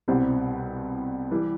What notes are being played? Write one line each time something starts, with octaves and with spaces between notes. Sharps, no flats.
C2 B2 G3 C4 E4
E3 G3